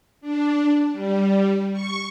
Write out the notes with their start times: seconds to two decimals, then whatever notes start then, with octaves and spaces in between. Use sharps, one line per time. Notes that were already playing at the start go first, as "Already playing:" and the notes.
0.21 D4
0.92 G3
1.72 C#6